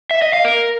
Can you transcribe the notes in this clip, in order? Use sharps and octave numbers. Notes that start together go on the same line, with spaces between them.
E5
D#5
F5
A#4